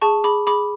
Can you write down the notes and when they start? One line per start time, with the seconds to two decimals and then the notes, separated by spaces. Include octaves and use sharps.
0.02 G#4 A5 C#6
0.24 G#4 B5 D6
0.47 G#4 B5 D6